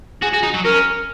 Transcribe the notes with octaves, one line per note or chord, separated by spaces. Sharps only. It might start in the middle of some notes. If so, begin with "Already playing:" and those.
F#4 G#4
F#4
D#4
F#3
C#4 A#4